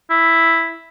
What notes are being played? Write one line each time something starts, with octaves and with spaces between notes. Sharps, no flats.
E4